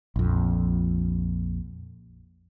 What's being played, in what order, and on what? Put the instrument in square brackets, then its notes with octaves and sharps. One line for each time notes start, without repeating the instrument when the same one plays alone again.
[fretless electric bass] A#1 F2